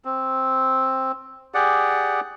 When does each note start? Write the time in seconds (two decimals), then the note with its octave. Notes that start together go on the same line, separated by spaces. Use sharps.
0.05 C4
1.54 G4 G#4 D5 F#5